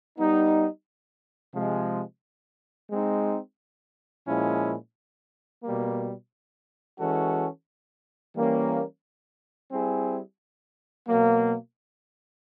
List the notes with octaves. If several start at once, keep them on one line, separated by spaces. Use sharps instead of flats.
G3 B3 D#4
C3 F3 G#3
G#3 C4 D#4
A#2 F3 G#3 C#4 E4
B2 G3 A#3
E3 G#3 C#4 F#4 A4
E3 G3 A#3 C#4
G3 C4 E4 G#4
B2 F#3 A#3